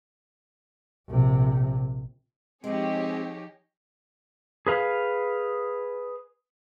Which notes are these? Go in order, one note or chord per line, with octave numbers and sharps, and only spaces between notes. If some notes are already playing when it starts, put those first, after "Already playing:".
A#1 C3
F3 G#3 C4 D#4 G4 G#4 C#5
G#4 B4 F5